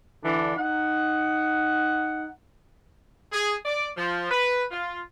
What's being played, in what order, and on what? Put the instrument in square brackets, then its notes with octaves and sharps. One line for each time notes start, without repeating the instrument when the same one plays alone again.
[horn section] D3 E3 D4
D#4 F#5
G#4
D5
F3
B4
F4